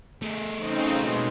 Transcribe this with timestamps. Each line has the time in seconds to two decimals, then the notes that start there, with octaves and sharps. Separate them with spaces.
0.22 A3 G#4
0.57 C#3 C4 D#4
0.97 B2 G#3